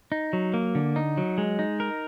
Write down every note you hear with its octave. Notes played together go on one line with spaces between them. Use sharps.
D#4
F#3
A#3
D3
D#4
F#3
G#3
D#4
A#4